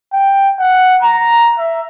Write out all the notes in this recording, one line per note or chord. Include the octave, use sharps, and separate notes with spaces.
G5
F#5
A#5
E5